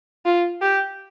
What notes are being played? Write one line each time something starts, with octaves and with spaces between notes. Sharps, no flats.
F4
G4